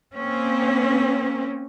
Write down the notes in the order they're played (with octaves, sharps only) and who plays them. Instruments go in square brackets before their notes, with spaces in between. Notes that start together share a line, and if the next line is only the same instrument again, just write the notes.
[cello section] A#3 C4 C#4